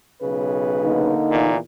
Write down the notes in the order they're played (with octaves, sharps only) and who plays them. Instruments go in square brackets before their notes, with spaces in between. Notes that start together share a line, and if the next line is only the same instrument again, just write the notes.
[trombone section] B1 C#3 B4
[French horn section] D3 A#3 D#4
[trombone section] E2 A#2 D#3